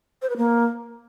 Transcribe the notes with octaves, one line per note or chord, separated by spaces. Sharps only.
C5
B4
A#3